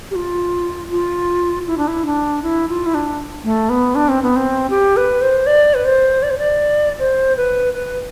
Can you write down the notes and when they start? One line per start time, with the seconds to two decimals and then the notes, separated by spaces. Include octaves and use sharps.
0.11 G4
0.15 F4
0.91 F4
1.67 E4
1.78 D4
1.88 E4
2.06 D4
2.43 E4
2.69 F4
2.86 E4
2.94 D4
3.44 A3
3.70 B3
3.95 D4
4.09 C4
4.23 B3
4.36 C4
4.70 G4
4.97 B4
5.22 C5
5.47 D5
5.74 B4
5.85 C5
6.23 D5
6.30 C5
6.38 D5
6.99 C5
7.37 B4
7.74 B4